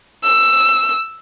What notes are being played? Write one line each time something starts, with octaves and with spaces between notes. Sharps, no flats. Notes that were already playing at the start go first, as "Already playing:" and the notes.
E6